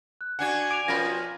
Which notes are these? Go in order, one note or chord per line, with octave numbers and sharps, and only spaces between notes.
F#6
D3 D4 F#4 F#5 G#5 G#6
D6 D7 F7
B2 F3 C#4 F4 A#4 B5 A#6